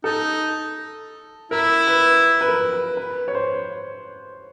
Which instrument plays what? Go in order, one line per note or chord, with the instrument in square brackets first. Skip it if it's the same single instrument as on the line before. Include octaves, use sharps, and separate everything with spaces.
[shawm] D#4 [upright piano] A4
[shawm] E4 [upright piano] A#4
[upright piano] B4
B4
A#4
B4
B4
C#5
C5